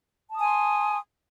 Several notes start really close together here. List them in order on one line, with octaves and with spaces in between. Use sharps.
A5 D#6 G#5 C6